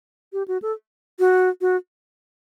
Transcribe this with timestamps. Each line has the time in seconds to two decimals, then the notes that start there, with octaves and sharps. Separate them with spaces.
0.33 G4
0.48 F#4
0.62 A4
1.19 F#4
1.61 F#4